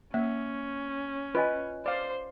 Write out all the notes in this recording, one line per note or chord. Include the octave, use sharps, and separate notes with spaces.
A#3 C#4 E5
F4 B4 D#5 G#5
C5 D5 F5